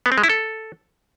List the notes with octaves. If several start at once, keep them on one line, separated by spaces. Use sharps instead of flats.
B3
C4
G#3
E4
A4